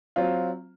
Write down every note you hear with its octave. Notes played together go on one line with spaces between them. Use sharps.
F#3 C4 F4